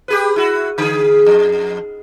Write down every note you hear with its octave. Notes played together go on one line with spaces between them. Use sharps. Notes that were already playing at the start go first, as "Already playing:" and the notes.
G4 G#4 B4
E4 F#4
D3 G#4
F2